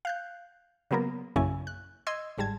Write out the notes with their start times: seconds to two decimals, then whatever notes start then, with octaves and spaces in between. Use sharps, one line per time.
0.05 F5 F#6 G6
0.91 C#3 F#3 A#3 B3 A#4
1.36 A#1 F#2 C#3 C#4 E4 G#5
1.67 F#6
2.07 D#5 C6 E6 G#6 C7
2.38 G1 G#2 G3 A5 G#6